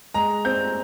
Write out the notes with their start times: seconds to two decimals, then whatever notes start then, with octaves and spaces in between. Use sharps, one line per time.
0.14 G#3 A#5
0.45 C4 G6